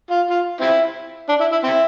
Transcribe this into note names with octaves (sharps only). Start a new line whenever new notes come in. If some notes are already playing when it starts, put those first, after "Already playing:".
F4
F4
C4 E4
D4
E4
E4
C4 E4